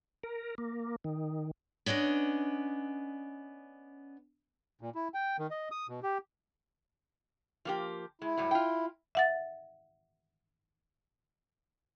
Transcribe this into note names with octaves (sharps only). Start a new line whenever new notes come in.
A#4
A#3
D#3
B3 C#4 D4 D5 D#5
A#2
E4
G5
D#3
D#5
D#6
B2
G4
F3 A#3 G4
G#3 E4
A2 F#3 G3
F4 G5
E5 F#5 A6